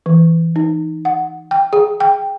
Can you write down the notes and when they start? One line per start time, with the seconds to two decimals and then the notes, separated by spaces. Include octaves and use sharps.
0.06 E3
0.56 D#4
1.05 F#5
1.51 G5
1.73 G#4
2.00 G5